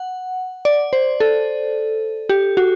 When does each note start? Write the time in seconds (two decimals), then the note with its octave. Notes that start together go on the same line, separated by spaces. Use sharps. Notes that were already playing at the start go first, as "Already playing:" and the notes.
Already playing: F#5
0.65 D5
0.93 C5
1.20 A4
2.29 G4
2.57 F#4